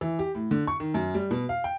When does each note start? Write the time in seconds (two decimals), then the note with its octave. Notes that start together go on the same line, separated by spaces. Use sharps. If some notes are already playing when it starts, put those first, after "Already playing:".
0.01 E3
0.19 G4
0.35 A2
0.51 D3
0.67 C#6
0.80 D#3
0.94 F#2
1.14 G3
1.31 B2
1.49 F5
1.64 G5